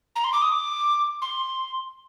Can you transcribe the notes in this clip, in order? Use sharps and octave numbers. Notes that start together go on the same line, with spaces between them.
A#5
C6
D6
D#6
D6
C6